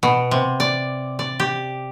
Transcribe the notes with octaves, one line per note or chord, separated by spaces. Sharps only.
B2
C3
D5
D5
G4